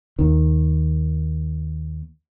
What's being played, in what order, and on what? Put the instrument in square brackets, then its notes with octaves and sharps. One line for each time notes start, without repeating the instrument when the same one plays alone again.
[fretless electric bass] D#2 D#3